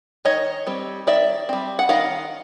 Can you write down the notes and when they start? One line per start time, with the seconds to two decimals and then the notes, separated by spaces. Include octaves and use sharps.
0.25 D#3 C#5 D#5
0.67 G3 C4
1.07 D#3 D5 E5
1.49 G3 C4
1.79 F#5
1.89 D#3 D#5 F5